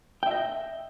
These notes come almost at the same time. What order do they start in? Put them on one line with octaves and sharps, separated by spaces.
G5 E5 D#5